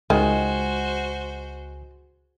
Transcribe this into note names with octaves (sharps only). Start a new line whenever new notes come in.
C#2 D#3 G#3 F#4 C5 G#5